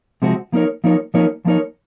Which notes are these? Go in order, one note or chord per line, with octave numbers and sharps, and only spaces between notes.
C3 F3 G#3 C4 F#4
F3 A#3 D#4 A#4 C#5
F3 A#3 D#4 A#4 C#5
F3 A#3 D#4 A#4 C#5
F3 A#3 D#4 A#4 C#5